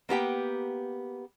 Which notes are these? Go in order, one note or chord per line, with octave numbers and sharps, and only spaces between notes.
A#3 B3 G4 G5